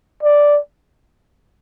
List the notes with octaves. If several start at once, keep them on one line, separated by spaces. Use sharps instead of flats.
D5